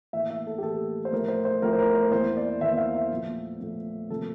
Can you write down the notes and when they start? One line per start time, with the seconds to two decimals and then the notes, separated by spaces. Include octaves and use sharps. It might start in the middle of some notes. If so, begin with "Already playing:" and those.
0.13 A2 E3 A#3 E5
0.30 E5
0.47 A4
0.58 G4
0.63 A2 E3 A#3 A4
1.05 C5
1.12 A2 F3 A3 A#4
1.28 C5
1.45 C5
1.62 A2 F3 A3 A#4
1.73 C5
1.79 A#4
1.95 C5
2.11 E2 E3 A#3 C5
2.37 D5
2.61 E2 E3 A#3 E5
2.73 E5
2.78 F5
2.95 E5
3.11 A#2 F3 A3
3.61 A#2 F3 A3
4.10 C3 F3 A#3 A4